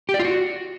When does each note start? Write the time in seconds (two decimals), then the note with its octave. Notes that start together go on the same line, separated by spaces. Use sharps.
0.09 G4
0.14 D5
0.19 F4
0.25 F#4